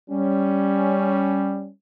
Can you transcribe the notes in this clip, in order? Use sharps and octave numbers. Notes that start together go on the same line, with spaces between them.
G3 C#4